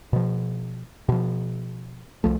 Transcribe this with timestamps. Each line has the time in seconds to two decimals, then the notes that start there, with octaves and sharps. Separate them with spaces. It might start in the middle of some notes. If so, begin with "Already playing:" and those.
0.13 B2 F3
1.09 B2 F3
2.24 C2 F3 A3